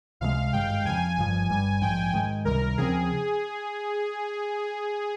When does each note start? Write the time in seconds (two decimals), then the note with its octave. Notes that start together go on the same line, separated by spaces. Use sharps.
0.21 C#2 C3 F3 G#3 F5
0.53 G#1 G2 D#3 G#3 G5
0.85 F2 C#3 F3 G#5
1.17 G1 G2 F3 G#5
1.49 G1 G2 G3 G#5
1.81 A#1 G#2 F3 G5
2.14 G#2 D#3 G#3
2.45 C#2 C3 D#3 G3 A#4
2.78 D#2 C#3 F3 C4 G#4